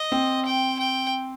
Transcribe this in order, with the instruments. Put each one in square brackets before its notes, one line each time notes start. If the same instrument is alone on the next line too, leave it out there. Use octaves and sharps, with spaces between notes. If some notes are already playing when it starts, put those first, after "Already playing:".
Already playing: [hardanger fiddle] D#5
[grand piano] C4
[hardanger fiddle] G5
G5